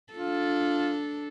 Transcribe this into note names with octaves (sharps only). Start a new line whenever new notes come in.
D4 F4 A4